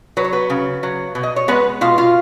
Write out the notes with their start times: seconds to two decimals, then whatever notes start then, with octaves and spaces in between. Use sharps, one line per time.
0.17 F#3 B4
0.24 C#5
0.33 B3 B4
0.50 C#3
0.83 F#3
1.15 B2
1.23 D#5
1.36 C#5
1.48 G#3 B3 B4
1.81 B2 F4 F5
1.98 F4 F5